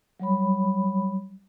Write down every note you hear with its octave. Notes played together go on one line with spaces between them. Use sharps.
F#3 G3 C#5 B5